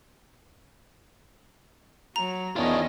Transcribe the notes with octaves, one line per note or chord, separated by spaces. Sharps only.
F#3 A#5
E2 D#3 B3 C#4 D4 E4 F4 D#5